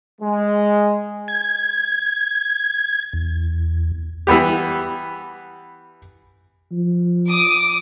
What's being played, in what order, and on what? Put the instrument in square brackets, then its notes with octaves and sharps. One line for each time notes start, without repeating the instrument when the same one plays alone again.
[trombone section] G#3
[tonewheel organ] G#6
E2
[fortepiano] E3 G3 B3 G4
[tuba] F3
[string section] D6 D#6